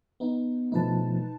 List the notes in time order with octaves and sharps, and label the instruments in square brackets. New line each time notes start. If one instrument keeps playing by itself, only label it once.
[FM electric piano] B3 D#4
[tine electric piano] B2 F3 A3 [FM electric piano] D#4 B4 A5